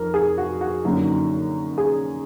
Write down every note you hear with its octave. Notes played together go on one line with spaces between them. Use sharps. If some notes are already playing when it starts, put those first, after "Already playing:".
Already playing: F2 D#4 A#4
G#4
F#4
F#4
F#2 D3 F#3 A#3 D#4
G#4